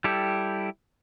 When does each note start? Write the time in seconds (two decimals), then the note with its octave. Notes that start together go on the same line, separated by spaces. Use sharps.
0.04 G3 E4 G4 A4